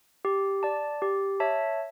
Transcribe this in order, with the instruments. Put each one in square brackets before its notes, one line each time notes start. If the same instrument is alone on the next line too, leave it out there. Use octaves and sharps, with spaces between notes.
[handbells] G4
D5 A5
G4
C#5 E5 A5